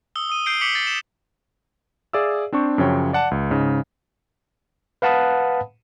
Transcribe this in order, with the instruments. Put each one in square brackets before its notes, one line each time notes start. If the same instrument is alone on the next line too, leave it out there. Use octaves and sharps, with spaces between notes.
[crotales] D#6 E6 G7
D#6 D#7
G6 C7 D7 G7
D6 B6 C#7 F#7
A6
E7
[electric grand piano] G#4 D5 E5 F5 E6
C4 D4 C5 C#6
F#2 C#3 F3 F#3 C#5 G5
D5 F#5 A5
C#2
G#2 C#3 D#4
[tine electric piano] B4 F5 F#5 A5 B5 D#6